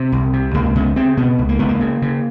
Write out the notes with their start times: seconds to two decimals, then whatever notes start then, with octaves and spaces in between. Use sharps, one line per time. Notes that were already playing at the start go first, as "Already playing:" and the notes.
Already playing: C3 C4
0.12 C2
0.33 C3
0.54 C#2 A#3
0.75 C#3 B3
0.96 C#3 C4
1.17 B2 B3
1.38 C#2
1.49 A#3
1.59 C#2 B3
1.69 A#3
1.81 C#3
2.02 C#3